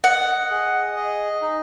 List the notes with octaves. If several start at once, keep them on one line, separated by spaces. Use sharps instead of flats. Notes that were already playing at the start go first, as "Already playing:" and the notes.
D#5 F#5
G#4
D#5
D#4